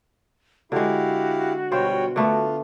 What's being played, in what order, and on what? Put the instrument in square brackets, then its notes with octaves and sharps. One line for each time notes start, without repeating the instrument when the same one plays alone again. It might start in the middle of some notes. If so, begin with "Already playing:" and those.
[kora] D3 G#3 [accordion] E4 G4 F5 [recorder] F#4
[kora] B2 F4 C5 [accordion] G3 C#5 G5
[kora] D3 A3 B3 [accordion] F4